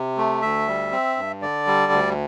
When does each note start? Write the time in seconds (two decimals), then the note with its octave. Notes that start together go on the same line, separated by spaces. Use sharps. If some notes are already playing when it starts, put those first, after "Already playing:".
Already playing: C3
0.17 A3
0.42 D2 E5
0.67 G3
0.92 C4
1.17 G2
1.42 D3 D5
1.67 G3
1.92 D2